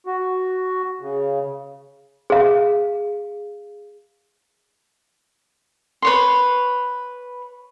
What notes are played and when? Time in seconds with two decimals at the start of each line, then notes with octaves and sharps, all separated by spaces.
0.06 F#4
1.01 C#3
2.30 G#4 F5
6.02 B4 C#5 C6